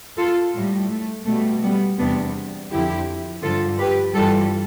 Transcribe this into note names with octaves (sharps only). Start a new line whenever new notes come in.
F4 A4
A2 G3
A3
B2 G3 A3
G3 B3
E2 C3 G3 B3 D4
F2 D3 F3 E4 G4
G2 D3 F3 F4 A4
G4 B4
G2 E3 G3 F4 A4